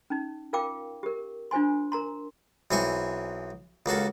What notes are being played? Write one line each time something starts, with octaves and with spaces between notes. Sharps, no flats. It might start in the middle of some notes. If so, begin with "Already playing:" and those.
C#4 D#4
F4 A#4 F5 G5 D6
G4 A#4
D4 F4 C5 G#5 C6
A#4 A#5 C6
B1 E3 C4 G#5 C#6
C#2 A#3 F#4 A4